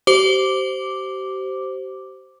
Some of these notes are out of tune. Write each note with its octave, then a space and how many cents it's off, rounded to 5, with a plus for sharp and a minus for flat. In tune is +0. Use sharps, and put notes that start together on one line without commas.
G4 -40 C5 +0 D6 +0